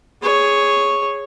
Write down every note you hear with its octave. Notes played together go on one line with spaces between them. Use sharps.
G#4 C#5